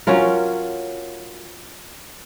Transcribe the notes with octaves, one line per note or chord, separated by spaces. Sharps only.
F#3 C#4 F4 A#4